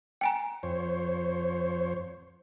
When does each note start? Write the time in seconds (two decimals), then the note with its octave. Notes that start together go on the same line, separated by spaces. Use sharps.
0.21 G5 G#5 A#5
0.63 F2 C5 C#5